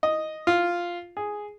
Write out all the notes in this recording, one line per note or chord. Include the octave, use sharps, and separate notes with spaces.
D#5
F4
G#4